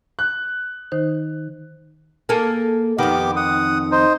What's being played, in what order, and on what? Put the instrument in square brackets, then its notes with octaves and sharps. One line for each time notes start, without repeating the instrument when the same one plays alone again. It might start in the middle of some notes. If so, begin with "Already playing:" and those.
[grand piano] F#6
[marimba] D#3 D#4 C5
[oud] A#3 G#4 A4
[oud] F2 D#3 [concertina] B3 G4 D6
[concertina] F#5 D#6
D#4 C5